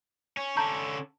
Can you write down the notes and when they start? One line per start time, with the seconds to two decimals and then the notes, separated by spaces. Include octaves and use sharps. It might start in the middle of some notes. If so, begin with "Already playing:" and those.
0.37 C#4
0.57 D3 C#4 A5 A#5 G6